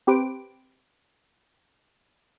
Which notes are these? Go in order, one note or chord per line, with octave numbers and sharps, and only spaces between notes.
C4 G4 B4 C5 D7